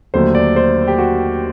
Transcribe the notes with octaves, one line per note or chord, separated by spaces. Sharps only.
D#2 D3 F#3 A3 C5
D5
C5
G4
F#4